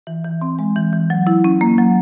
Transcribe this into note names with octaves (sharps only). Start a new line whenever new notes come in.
E3
E3
C4
G#3
E3
E3
F#3
E4
C#4
A#3
F#3